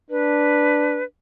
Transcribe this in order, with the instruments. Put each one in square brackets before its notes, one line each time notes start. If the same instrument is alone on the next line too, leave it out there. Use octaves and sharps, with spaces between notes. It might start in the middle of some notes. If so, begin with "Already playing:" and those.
[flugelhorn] D4 [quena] B4